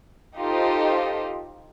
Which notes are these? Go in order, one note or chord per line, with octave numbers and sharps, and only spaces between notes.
D#4 F4 G4 A4 C5 D#5